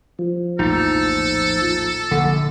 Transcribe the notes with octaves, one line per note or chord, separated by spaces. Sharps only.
F3
A#1 E2 A2 D#4 A4
A#1 D3